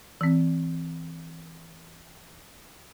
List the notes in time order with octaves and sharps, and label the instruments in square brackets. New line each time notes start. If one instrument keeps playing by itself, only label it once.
[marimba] E3 C4